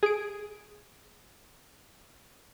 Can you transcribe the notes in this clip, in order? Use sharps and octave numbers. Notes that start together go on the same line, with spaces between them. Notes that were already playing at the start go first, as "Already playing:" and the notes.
G#4 D7